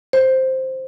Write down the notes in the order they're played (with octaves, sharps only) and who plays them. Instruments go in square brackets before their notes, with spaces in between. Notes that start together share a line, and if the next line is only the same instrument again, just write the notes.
[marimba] C5